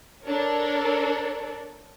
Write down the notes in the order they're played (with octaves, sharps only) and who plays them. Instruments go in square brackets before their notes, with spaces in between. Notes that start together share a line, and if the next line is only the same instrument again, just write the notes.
[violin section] D4 A4 A#4 C#5